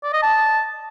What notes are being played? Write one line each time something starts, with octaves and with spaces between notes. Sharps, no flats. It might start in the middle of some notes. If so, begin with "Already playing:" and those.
D5
D#5
A5